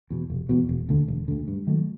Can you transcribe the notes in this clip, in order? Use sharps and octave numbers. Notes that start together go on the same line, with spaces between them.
E2 B2
F1
E2 B2
E1
D2 D3
E1
D2 D3
G2
D#3 F#3 A3